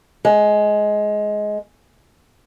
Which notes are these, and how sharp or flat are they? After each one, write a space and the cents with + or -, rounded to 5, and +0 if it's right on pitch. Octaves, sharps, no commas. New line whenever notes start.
G#3 +15